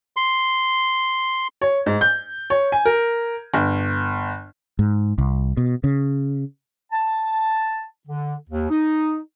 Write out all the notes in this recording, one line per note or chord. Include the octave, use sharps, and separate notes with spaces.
C6
C#5
G#2
G6
C#5
G#5
A#4
G1
G#2
C2
B2
C#3
A5
D3
D#2
D#4